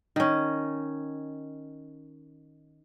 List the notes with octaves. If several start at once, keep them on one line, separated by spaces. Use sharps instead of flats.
D#3 C#4